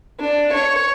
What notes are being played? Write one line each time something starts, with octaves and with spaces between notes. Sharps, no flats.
D4
C#5